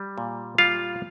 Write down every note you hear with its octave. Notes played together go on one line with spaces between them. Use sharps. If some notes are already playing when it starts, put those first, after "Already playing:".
Already playing: G3
A#2
G3 F4 F5